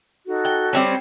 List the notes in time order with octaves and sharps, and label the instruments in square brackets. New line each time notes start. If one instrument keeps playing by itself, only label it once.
[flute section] D#4 F#4 A4
[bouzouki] G5
G3 C4 C#4